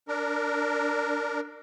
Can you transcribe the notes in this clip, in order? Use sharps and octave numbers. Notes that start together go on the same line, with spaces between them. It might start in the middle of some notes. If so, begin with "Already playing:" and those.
D4 A#4